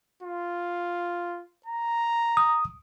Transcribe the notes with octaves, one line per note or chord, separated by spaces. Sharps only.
F4
A#5
D#6